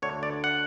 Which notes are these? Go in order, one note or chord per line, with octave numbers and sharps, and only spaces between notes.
D2 D3 A3 D4 C#5
D5
F#5